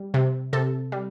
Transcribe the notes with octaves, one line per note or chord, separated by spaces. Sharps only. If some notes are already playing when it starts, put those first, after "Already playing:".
Already playing: G3
C3
C3 A4
G3